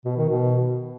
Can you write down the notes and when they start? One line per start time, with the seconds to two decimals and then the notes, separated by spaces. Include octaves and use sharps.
0.05 B2
0.17 D#3
0.29 B2